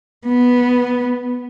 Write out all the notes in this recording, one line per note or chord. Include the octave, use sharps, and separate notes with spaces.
B3